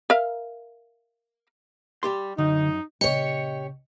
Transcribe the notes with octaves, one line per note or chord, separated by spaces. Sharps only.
A#4 E5 F5
G3 G4 C6
F#2 D3 D#4
A#1 C#3 G4 C#5 D#5 C#7